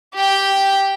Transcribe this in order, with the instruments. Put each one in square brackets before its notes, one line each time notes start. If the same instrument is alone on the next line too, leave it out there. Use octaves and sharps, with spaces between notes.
[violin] G4 G5